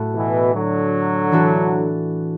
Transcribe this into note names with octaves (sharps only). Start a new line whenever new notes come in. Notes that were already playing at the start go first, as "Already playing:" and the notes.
Already playing: A2 A3 F#4
B2 E3
D3 F#3
E3 D4 F#4 A4